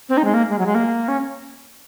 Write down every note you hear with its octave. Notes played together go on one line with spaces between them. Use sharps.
C4
D#4
G#3
A#3
G#3
F#3
G#3
A#3
C#4